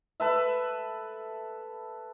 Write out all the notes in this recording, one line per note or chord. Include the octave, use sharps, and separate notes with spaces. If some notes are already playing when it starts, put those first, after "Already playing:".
A4 B4 E5